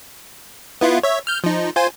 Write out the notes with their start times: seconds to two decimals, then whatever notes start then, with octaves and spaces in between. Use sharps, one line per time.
0.81 B3 E4 F4
1.04 C#5 E5
1.27 F6 G6
1.44 F3 D#4
1.76 F4 C5 G#5